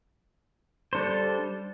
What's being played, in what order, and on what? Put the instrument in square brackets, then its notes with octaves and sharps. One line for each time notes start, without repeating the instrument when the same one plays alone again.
[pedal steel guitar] G3 D4 A4 C5